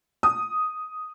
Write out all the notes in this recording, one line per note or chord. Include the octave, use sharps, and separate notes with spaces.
D#6